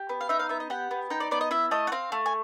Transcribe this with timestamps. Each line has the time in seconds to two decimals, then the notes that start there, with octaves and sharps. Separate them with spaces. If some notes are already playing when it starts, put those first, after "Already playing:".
Already playing: G4
0.09 B3
0.21 F5
0.29 D#4 E5
0.39 F5
0.49 B3 E5
0.60 D#5
0.70 G4 F#5
0.91 B3
1.10 D#4 G5
1.20 D5
1.31 B3 D5
1.41 D#5
1.51 E4 E5
1.71 A3 D#5
1.87 F#5
1.92 C4 F5
2.12 A3
2.26 G#5